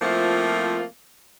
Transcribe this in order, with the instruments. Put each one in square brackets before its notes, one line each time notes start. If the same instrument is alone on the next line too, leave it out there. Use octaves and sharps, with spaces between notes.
[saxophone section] F3 A3 A#3 C4 E4 F4